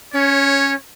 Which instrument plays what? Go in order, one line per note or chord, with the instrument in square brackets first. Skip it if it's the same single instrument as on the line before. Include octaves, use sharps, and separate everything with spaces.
[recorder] C#4 [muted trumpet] C#5